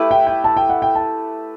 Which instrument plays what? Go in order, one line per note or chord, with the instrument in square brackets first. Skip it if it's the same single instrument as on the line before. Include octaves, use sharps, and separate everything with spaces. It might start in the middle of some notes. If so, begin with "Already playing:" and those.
Already playing: [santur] A3 E4 G4 B4
[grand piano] G5
G5
A5
G5
F#5
G5
A5